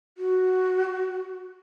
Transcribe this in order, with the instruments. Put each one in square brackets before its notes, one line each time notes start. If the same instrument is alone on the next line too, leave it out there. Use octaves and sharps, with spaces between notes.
[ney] F#4